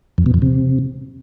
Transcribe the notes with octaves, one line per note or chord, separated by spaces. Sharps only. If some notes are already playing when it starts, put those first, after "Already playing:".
F2
B2
F2
C3